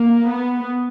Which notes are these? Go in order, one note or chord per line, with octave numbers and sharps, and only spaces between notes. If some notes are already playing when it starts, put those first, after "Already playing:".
Already playing: A#3
B3